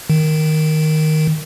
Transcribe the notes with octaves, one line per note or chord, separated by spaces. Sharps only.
D#3